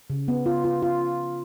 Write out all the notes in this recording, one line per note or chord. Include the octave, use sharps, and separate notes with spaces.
C#3
B3
F4
F4
F4